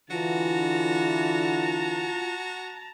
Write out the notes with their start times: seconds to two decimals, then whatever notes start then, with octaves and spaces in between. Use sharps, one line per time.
0.11 D3 E3 F4 F#4 A5 A#5